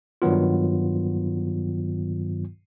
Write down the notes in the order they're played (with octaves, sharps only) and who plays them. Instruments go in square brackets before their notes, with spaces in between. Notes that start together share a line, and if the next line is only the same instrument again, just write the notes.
[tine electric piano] G2 D#3 F#3 B3 F4